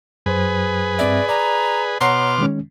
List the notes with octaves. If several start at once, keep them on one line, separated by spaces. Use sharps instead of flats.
F#2 F#3 G#4 B4 C5
G2 C4 D5 E5
D5 A#5
B2 C#5 F#5 A#5 C6 D6 F6
D#3 G#3 C#4